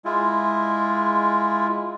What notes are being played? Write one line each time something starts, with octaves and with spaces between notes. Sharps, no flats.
G#3 E4 F4